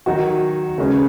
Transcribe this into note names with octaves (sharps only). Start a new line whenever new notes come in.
D#3 F#3 D#4 F#4
C#3 G#3 C#4 G#4 B4